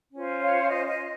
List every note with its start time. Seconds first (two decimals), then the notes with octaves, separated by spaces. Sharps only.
0.13 C#4 F4 C5
0.41 C#5 F5
0.63 F5
0.69 D#5
0.88 D#5